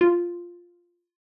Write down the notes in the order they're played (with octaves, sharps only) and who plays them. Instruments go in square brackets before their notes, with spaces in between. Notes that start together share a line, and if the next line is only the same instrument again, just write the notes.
[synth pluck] F4